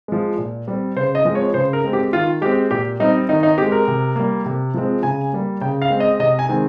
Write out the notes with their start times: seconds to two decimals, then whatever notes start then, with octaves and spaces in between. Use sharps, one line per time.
0.08 F3 G#3
0.38 A#2
0.68 G3 C4
0.96 C#3 C5
1.15 D#5
1.25 F3 G#3 C4
1.35 C#5
1.54 C#3 C5
1.73 A#4
1.84 G#3 C4
1.93 G4
2.13 D#3 F4
2.41 G#3 C4 G4
2.71 A#2 G4
3.00 G3 C4 D#4
3.29 D#3 D#4
3.43 D#4
3.58 G#3 C4 G4
3.72 A#4
3.88 C3
4.16 G3 A#3
4.46 C3
4.74 F3 G#3 C4
5.03 C#3 G#5
5.33 G3 A#3
5.61 C#3 G5
5.82 F5
5.90 G#3 C4
6.00 D#5
6.19 C3 D#5
6.39 G#5
6.49 D#3 G#3 C4